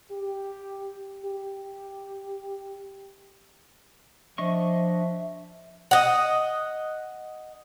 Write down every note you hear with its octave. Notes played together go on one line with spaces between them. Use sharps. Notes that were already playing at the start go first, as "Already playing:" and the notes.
G4
G4
F3 D4 D#5 E5 C#6
D#5 F#5